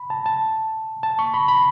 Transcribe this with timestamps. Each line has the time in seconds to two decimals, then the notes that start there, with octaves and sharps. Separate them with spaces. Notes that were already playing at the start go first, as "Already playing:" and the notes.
Already playing: B5
0.10 A5
0.26 A5
1.03 A5
1.19 C#6
1.34 B5
1.48 B5